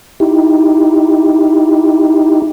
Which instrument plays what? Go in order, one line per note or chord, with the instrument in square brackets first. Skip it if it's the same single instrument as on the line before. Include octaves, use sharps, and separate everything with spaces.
[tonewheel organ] D#4 E4 G4